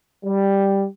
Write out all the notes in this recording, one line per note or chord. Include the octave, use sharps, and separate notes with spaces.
G3